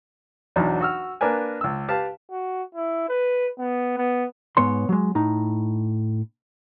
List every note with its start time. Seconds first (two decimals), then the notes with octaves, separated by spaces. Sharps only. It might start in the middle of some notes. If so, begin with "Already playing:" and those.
0.56 B1 E2 F#3 D4 D#4
0.81 F#4 E6 F6
1.21 A#3 D4 A#4 B4 G#5
1.61 C#2 E6
1.88 G4 B4 F5 A5
2.31 F#4
2.75 E4
3.09 B4
3.59 B3
3.97 B3
4.57 G#2 B3 C#5 C6
4.89 F#3 G#3
5.15 A2 D#4